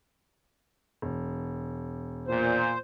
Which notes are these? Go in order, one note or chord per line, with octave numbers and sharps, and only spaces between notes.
E1
A#2 C5